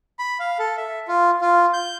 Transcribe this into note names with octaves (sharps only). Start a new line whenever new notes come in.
B5
F5
A4
E5
F4
F4
G6